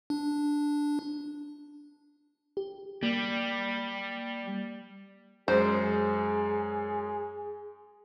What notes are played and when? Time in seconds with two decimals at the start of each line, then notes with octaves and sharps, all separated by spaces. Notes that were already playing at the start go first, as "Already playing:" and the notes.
0.10 D4
2.57 G4
3.03 G3 A#3
5.48 F#2 G#3 G#4 C5